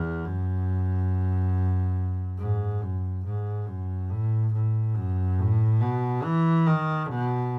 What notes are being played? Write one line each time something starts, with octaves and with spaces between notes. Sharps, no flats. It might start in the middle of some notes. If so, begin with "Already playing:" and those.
Already playing: E2
F#2
G#2
F#2
G#2
F#2
A2
A2
F#2
A2
B2
E3
D#3
B2